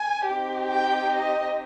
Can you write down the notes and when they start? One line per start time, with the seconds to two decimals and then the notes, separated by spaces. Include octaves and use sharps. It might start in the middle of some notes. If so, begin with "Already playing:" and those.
Already playing: G#5
0.29 C4 D#4 G4
0.71 G5
1.14 D#5